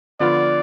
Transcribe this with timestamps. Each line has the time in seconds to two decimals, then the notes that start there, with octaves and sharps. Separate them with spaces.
0.20 D3 F3 B3 F4 D5